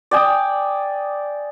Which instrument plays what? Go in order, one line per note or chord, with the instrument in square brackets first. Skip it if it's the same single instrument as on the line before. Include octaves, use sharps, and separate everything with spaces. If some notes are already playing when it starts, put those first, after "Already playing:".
[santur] D5 G5 G#5 D#6